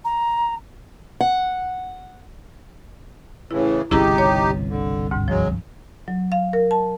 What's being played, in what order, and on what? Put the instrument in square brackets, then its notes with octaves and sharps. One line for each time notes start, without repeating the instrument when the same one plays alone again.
[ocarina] A#5
[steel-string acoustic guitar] F#5
[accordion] A2 C#3 E3 [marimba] E4
[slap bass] G1 C2 B2 [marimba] C#4 E4 G#4 [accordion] D#4 G4
[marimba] C#5
[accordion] D3
[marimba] D2 G#2
[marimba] F3 [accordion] F#3 G#3
[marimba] F#3
F5
A#4
A5